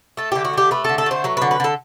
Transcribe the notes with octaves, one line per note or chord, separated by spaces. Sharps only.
A3 A4
D3 G4
F#4
A3 G4
A3 B4
D3 A4
A4
A3 C5
F#3 B4
D3 B4
B4
D3 A4